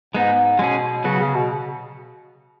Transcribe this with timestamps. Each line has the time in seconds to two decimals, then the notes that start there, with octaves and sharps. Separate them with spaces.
0.14 G#2 G#3 B3 D#4
0.59 B2 G#3 C#4 G#4
1.04 C#3 F#3 B3 F#4
1.20 C#3
1.34 B2